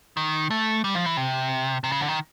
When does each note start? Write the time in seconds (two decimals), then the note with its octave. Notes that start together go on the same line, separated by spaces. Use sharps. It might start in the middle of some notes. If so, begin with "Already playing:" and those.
0.17 D#3
0.51 A3
0.84 G3
0.95 F3
1.06 E3
1.17 C3
1.84 C3
1.92 C#3
2.01 D3
2.08 D#3